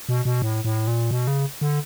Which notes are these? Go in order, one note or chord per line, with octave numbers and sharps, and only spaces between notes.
B2
B2
A2
A2
A#2
B2
C#3
D3